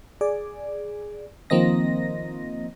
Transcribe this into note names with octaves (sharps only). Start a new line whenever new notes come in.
G#4 D5
D#3 F3 A#3 C4 D#5 A#6